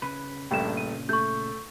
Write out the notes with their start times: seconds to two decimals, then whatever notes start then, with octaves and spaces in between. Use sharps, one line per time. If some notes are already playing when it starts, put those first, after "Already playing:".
0.02 C#3 B4
0.51 A#1 G2 A#2 C#3 A3 G5 E7
0.77 D#7
1.09 A3 C#6 G6